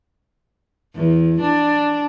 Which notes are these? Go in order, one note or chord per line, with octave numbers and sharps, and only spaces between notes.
E2
D4